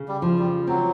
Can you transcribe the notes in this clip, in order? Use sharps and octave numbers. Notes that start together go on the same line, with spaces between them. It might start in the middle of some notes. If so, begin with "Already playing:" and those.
Already playing: C#3
G3
F3
G3
F#3 C4